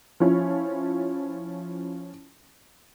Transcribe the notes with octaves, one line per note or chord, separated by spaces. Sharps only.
F3 C#4 E4